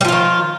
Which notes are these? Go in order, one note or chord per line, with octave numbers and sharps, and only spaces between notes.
D#3 F3 G3 F4